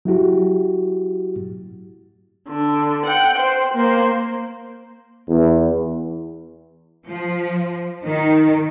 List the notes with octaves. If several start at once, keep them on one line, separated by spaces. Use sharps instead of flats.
F#3 E4 F#4 G4
D3
F#5 G5
C5
A#3 C5
E2
F3
D#3